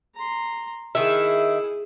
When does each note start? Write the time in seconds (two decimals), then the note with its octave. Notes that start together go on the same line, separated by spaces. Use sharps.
0.15 A#5 C6
0.95 D#3 E4 G#4 E5